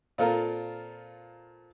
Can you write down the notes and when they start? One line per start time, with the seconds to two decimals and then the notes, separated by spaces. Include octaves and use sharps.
0.18 A#2 C4 F4 A4 A#4